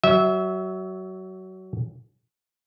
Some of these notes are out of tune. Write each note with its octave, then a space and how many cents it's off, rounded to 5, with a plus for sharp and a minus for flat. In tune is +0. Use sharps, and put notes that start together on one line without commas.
F#3 +20 E5 -20